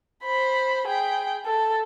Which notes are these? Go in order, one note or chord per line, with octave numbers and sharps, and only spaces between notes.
C5 B5
G#4 G5
A4